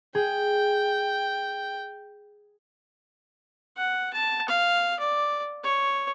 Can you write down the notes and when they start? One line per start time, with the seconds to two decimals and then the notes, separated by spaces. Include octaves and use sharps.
0.15 G#4 G5
3.77 F#5
4.13 A5
4.48 F5
4.99 D5
5.63 C#5